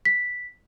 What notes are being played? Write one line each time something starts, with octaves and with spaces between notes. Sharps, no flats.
B6